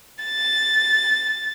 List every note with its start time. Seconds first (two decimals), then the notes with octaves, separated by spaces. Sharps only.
0.23 A6